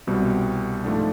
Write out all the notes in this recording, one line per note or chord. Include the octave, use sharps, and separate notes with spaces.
C2 B2 G3 C4
G#2 F3 A3 D4